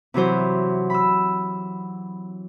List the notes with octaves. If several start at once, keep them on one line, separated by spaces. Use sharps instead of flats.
C3 E3 F#3 C5
B5 E6